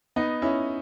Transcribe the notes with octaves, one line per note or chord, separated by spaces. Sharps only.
B3 D#4
C#4 E4